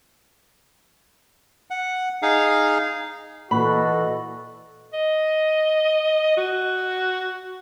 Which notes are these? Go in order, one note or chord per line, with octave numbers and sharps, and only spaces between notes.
F#5
D#4 G#4 F5
A#2 E3 F#4 A4 D5 D#5 B5
D#5
F#4